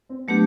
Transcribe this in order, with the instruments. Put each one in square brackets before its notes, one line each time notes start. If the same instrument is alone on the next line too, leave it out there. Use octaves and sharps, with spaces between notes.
[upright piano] C4
[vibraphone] F#3 A3 D4 G4 [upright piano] B3